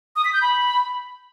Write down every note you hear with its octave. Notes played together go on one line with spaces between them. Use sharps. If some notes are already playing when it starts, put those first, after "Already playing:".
D#6
B6
G6
B5